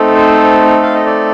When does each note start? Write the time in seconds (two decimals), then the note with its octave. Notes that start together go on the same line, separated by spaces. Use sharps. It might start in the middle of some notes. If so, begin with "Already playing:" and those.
Already playing: A3 C4 D#4 A4
0.15 C5
0.83 F5
0.94 D#5
1.06 D5